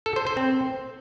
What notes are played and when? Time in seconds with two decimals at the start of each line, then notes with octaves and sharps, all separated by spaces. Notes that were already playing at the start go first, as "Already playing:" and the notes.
0.06 A4
0.16 C5
0.27 C5
0.37 C4